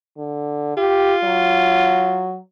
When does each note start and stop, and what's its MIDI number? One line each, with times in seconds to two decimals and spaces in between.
0.17 0.73 50
0.77 2.30 65
0.77 1.16 67
1.24 2.38 54